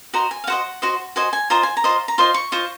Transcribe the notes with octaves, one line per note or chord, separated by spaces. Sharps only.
F#4 C5 D#5 A#5
G#5
F5
F#4 C5 D#5 F#5
F#4 C5 D#5
F#4 C5 D#5 G#5
G#5
F4 C5 D#5 A#5
G#5
A#5
F4 C5 D#5
A#5
F4 C5 D#5 C6
C#6
F4 C5 D#5 C#6